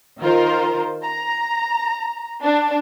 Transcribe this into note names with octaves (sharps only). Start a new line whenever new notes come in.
D#3 F4 A#4 C5
A#5
D4